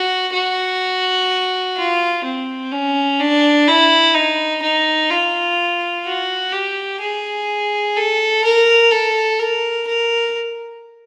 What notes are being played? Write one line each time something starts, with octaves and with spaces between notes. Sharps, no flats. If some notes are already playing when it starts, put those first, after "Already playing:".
Already playing: F#4
F#4
F4
C4
C#4
D4
E4
D#4
D#4
F4
F#4
G4
G#4
A4
A#4
A4
A#4
A#4